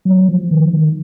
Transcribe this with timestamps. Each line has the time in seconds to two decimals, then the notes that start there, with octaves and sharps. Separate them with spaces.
0.05 F#3
0.29 F3
0.51 D#3
0.73 D#3